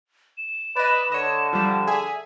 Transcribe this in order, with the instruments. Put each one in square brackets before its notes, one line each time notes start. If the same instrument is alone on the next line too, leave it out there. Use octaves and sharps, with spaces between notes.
[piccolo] E7
[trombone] B4 [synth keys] D5 D#5
[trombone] D3 [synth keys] C#5 D#5
[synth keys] F3 G3
G#4 E5 G#5